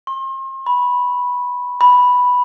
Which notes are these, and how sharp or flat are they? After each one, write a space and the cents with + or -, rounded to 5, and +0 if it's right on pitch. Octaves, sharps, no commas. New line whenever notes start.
C6 +40
B5 -5
B5 +0